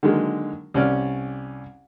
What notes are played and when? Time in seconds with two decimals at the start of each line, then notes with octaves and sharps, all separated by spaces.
0.03 D3 D#3 F#3 G#3 A#3
0.74 C2 C#4 D5 F6